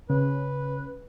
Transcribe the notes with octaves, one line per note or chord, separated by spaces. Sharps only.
C#3 B4